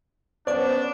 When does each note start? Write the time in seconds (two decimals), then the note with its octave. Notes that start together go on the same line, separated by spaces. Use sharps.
0.47 B3 C#4 D4 C5 D5 D6